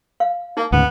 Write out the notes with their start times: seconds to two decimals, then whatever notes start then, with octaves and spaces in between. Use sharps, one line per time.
0.20 F5
0.57 A#3 D#4
0.72 D2 G#2 C#3 B3